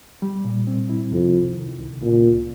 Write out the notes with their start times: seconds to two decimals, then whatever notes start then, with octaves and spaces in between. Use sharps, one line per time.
0.22 G3
0.45 A#2
0.67 C4
0.90 E4
1.12 F2 C3
1.34 C2
1.56 D#3
1.79 C2
2.02 A#2 C#3
2.24 C#2